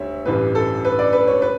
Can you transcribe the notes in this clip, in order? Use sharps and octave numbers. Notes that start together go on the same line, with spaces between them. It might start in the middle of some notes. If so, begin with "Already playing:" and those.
Already playing: D2 G3 C#5 E5
A1 G2 E3 G3 B4
A4
B4
D5
B4
C#5
B4